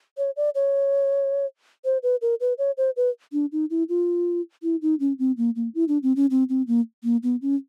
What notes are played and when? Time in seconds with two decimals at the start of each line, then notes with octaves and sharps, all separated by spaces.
0.18 C#5
0.37 D5
0.55 C#5
1.85 C5
2.03 B4
2.22 A#4
2.41 B4
2.58 C#5
2.77 C5
2.97 B4
3.33 D4
3.52 D#4
3.70 E4
3.89 F4
4.63 E4
4.82 D#4
5.00 C#4
5.19 C4
5.37 A#3
5.56 A#3
5.75 E4
5.88 D4
6.03 C4
6.16 C#4
6.31 C4
6.49 C4
6.67 A#3
7.04 A#3
7.23 B3
7.42 C#4